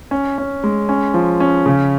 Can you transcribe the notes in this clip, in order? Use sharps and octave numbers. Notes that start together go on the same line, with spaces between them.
C#4
C#4
G#3
C#4
F3
C#4
C#3